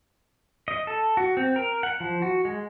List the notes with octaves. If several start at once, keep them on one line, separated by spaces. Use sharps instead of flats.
D#5
A4
F#4
C4
A#4
F#5
F3
F#4
G#3